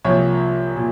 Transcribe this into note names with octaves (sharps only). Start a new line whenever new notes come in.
C2 A#2 F3 C#5
A#2